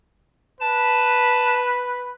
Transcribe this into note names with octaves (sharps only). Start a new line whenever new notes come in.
B4 A5